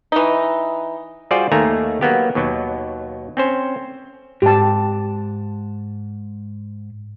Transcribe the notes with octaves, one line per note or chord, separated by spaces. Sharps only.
E3 D#4
G3 F4 F#4 G#4 C5 D5
D#2 D#3 A3 A#3 G#5 A#5
F#3 A#3 B3 G4
D#2 B2 F#3
C4 C#4 C5
G#2 G4 A5